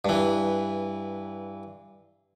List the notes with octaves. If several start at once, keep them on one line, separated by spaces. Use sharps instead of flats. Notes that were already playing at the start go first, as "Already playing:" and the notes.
G2 E3